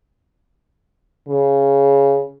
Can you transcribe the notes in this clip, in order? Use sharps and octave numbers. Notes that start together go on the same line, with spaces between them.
C#3